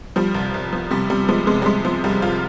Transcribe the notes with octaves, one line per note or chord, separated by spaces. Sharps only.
F3 G3
C2
C2
F3
C3 G3
C3 G3
F3 G#3
C3 G#3
G3
C3 G#3
F3
C2 G3
C2 F4